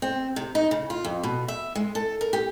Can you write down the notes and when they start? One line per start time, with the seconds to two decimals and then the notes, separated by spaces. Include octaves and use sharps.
0.02 C4
0.36 C3
0.55 D#4
0.71 C#3
0.90 F4
1.05 F2
1.23 B2
1.48 E5
1.75 G#3
1.95 A4
2.21 A#4
2.33 G4